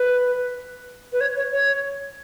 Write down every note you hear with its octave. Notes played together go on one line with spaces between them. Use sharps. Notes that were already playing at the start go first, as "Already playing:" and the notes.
Already playing: B4
B4
C#5
C#5
C#5